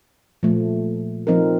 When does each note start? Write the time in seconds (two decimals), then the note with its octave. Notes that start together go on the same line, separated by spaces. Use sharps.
0.43 A#2 F3 A3
1.27 F3 C4 D#4 A#4